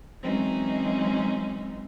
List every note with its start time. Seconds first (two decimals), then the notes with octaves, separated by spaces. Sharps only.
0.22 E3 F#3 G#3 C4 C#4 D#4